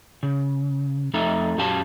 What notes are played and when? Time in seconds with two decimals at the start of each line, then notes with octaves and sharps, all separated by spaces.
0.23 C#3
1.14 F2 A3 D#4 E5 A#5
1.58 F#2 F#4 G4 F5 A5